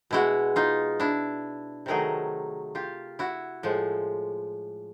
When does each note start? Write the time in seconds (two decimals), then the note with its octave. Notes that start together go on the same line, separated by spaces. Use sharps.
0.11 B2 G#3 E4 F#4
0.56 D#4 F4
1.00 D4 E4
1.86 C3 D#3 F#3 A3 G#4 A#4
2.75 F4 G4
3.19 E4 F#4
3.63 A2 F3 G#3